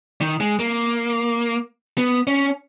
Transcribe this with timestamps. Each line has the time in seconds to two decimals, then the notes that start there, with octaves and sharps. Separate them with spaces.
0.21 D#3
0.40 G#3
0.60 A#3
1.98 B3
2.27 C#4